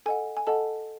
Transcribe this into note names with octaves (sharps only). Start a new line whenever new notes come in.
A4 D#5 F#5 G#5
G#5
A4 D#5 F#5 A5